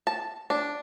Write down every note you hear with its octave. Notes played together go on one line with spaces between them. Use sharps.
A5
D4